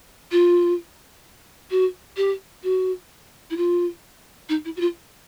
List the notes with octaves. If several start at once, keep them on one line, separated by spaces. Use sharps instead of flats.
F4
F#4
G4
F#4
E4
F4
D#4
E4
F#4
F4